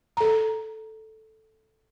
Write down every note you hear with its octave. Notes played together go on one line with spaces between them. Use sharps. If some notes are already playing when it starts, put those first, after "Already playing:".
A4 A#5